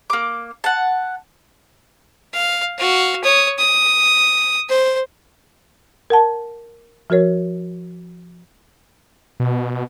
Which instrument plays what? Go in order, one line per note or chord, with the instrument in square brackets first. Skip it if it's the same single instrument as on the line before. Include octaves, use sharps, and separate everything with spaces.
[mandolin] A#3 D6
F#5 A5
[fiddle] F5
F#4 F5
C#5 D#6
D#6
C5
[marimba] A#4 F#5 A5
F3 F#4 A#4 C#5
[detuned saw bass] B2